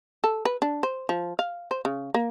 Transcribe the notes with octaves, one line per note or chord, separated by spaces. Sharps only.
A4
B4
D4
C5
F3
F5
C5
C#3
A#3